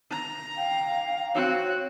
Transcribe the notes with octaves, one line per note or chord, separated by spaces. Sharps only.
A#5
F5 G5
C4 F#4 C#5